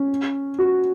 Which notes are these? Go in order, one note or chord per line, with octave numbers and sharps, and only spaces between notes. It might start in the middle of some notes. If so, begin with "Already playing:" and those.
Already playing: C#4
F#4